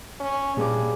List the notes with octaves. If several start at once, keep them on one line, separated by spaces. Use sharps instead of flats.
C#4
G2 A#2 G3 G#4 D6